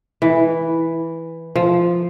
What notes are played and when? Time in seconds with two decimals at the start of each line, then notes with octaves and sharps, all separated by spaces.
0.22 E3
1.56 F3